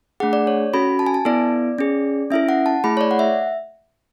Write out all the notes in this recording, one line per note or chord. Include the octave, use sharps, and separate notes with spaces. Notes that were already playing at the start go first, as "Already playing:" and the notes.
A3 D4 G#4 F#5
D5
C#5
C#4 F#4 A4 B5
A5
G#5
A5
B3 E4 A4 D5
C#4 G#4
C#4 E4 A4 E5
F#5
A5
A3 E4 G#4 B5
C#5
D5
F#5
E5